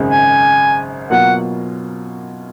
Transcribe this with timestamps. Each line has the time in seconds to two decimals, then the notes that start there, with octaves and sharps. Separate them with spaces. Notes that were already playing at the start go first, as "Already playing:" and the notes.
Already playing: G#1 F#2 C#3 G#3
0.10 G#5
1.10 B2 F#3 A#3 F4 F#5